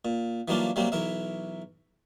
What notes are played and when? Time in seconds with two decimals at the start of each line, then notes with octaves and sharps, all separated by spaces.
0.05 A#2
0.48 E3 F#3 G3 A#3 D4 F4
0.76 C3 F#3 G3 A#3 C4
0.92 B1 E3 A#4 E5